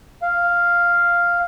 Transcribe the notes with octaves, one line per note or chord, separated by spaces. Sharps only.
F5